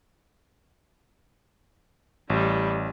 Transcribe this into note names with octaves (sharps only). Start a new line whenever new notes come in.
A1 G3